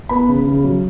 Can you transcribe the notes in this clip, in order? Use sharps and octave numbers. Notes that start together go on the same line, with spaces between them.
B3 B5
C#3
C#3
F#3